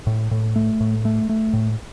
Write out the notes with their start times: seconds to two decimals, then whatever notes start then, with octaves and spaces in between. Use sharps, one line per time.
0.07 A2
0.31 A2
0.56 A3
0.81 A2
1.05 A3
1.29 A3
1.53 A2